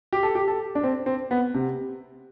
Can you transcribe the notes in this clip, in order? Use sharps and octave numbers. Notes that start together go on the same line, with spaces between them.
G4
A4
G4
A4
D4
C4
C4
B3
C3